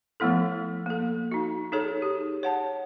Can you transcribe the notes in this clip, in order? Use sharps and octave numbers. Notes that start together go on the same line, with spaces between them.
F3 A3 B3 E4 A4
A#3 A4
D#4 F#4
D#4 G#4 A4 C#5
G4
C#5 F#5 A5